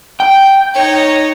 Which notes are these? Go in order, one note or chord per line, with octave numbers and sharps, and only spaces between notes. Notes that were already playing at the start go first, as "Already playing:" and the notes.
G5
D#4 C#5